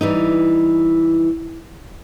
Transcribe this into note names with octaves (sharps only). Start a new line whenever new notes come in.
E3 G3 D#4